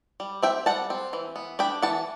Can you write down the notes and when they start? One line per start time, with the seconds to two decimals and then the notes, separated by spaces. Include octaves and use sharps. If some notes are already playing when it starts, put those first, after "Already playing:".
0.20 G3
0.43 C4 E5 G5
0.66 G3 F#5 A5
0.90 C4
1.13 E3
1.36 B3
1.59 D4 G5 B5
1.82 E3 F#5 A5